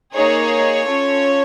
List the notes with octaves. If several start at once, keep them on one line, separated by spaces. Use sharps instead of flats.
A#3 D#4 G#4 C#5
C#4 F4 A4